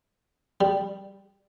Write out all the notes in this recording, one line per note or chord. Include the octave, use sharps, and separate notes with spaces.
G3